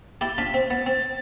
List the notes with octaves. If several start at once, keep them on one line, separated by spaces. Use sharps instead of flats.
E4 G4 A6
D4 F4 B6
C4
B3 A6
C4